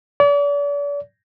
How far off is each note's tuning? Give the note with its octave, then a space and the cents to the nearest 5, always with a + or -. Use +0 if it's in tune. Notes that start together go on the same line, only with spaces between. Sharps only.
D5 -40